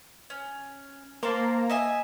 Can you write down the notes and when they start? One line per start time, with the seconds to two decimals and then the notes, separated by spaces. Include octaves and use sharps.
0.30 C#4
1.23 A#3 C5 F5 A5
1.69 D#5 E5 G#5